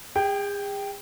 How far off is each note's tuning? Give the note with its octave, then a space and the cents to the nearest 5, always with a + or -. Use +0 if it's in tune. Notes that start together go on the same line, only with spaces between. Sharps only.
G#4 -40 G5 +0